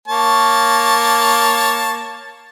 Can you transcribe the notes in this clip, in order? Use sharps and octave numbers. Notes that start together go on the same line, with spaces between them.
A#3 C#5 A5